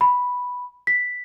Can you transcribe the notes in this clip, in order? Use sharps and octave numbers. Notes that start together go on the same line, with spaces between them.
B5
B6